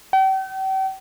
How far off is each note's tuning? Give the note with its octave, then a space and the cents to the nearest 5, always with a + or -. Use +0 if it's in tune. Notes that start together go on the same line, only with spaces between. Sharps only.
G5 -40